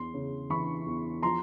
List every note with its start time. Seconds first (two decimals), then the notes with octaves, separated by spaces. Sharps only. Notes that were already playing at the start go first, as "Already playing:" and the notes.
Already playing: E2 C6
0.14 C#3
0.50 E3 B5 C#6
0.86 E2
1.23 F3 A#5 C6